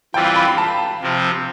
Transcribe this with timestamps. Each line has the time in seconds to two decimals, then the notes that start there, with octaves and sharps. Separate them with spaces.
0.14 E3 G3 C4 F4 G5
0.25 F5
0.36 B5
0.48 B5
0.58 A5
1.01 C3 F3 C4